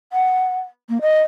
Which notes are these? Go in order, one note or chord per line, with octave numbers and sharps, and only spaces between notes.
F#5
A#3
D#5